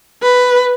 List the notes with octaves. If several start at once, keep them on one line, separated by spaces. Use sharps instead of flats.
B4